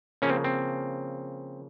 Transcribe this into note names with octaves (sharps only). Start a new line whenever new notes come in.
C#3 F3 A#3 C#4
C4
C4